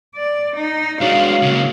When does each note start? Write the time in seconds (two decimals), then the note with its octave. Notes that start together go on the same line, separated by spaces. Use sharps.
0.15 D5
0.56 D#4
1.01 F#3 G#3 D4 F5
1.42 C#3 A#3